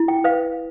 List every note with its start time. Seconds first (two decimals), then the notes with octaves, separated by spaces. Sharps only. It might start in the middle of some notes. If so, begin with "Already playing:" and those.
Already playing: E4
0.08 G5
0.24 B4 F5